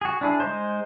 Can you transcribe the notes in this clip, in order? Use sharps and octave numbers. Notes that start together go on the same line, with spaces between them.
F#4 G#4
D4 E4 G#4
G#3 D#4 C5